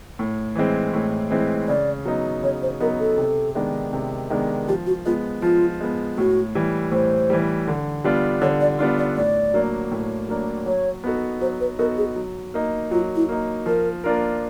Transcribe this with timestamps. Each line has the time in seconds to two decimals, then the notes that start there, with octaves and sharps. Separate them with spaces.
0.19 A2
0.55 E3 G#3 C4
0.94 A2
1.31 E3 G#3 C4
1.68 C#3 D5
2.05 F#3 B3 D#4
2.43 C#3 C#5
2.62 C5
2.80 F#3 B3 D#4 A#4
2.99 A4
3.18 C3
3.55 D#3 G#3 B3 D4
3.93 C3
4.30 D#3 G#3 B3 D4
4.68 F3 G4
4.87 F#4
5.06 G#3 B3 F4
5.42 F3 F4
5.81 G#3 B3
6.18 A2 F#4
6.55 E3 G3
6.92 A2 C5
7.30 E3 G3
7.68 D3
8.04 G3 B3 D4 F4
8.42 D3 C#5
8.61 D5
8.79 G3 B3 D4 F4 D5
8.98 D5
9.16 A2 D5
9.54 F#3 A#3 D4
9.91 A2
10.29 F#3 A#3 D4
10.66 F#3 C#5
11.04 B3 D#4 F#4 A4
11.41 F#3 C5
11.60 B4
11.79 B3 D#4 F#4 A4 A#4
11.97 G#4
12.16 F#3
12.54 A#3 D#4
12.91 F#3 F4
13.16 E4
13.29 A#3 D#4
13.66 F3 A#4
14.04 A#3 D4 F4 A#4